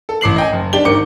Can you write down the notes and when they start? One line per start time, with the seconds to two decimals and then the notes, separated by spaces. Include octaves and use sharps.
0.09 A4
0.21 A1 D6 C7 F#7
0.36 D#5 G5 G#5
0.53 F#1
0.73 D4 G4 G7
0.85 G#1 A#4 D6 C#7